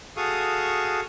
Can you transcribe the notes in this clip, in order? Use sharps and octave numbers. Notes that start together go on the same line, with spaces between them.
F#4 G#4 A4 F5 C#6 D#6